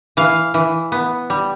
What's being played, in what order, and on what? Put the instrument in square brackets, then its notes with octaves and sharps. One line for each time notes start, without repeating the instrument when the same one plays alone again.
[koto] E3 F5
E3
B3
G3